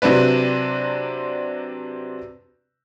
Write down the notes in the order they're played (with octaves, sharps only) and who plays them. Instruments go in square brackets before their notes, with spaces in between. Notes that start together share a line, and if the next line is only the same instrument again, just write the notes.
[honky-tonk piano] C3 F#3 C4 D4 B4